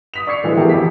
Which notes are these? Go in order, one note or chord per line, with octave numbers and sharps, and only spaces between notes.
D#6 B6 F7
D5 C#6 E6 G#6 C7 C#7
A2 D3 E3 F3 G#3
B3 E4 F#4 G4 A4 A#4
A1 F2 F3 G4 B6